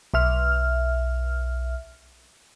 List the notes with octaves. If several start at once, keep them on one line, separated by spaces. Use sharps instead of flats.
B1 E5 F6